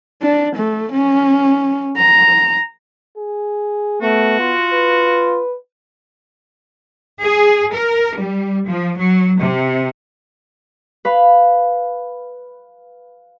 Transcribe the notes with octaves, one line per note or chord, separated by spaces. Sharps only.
D4
A3
C#4
A#5
G#4
A3 B3 F#4
F4
B4
G#4
A#4
G3
F3
F#3
C3
B4 F5 B5